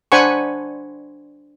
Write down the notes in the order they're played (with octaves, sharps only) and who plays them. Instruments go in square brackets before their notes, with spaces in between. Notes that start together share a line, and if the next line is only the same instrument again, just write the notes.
[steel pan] D4 C5 F#5 G#5 B5 C#6